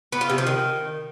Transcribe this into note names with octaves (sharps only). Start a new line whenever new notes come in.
B3
F4
C3
F3
D#3